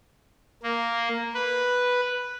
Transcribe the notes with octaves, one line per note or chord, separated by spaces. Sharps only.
A#3
B4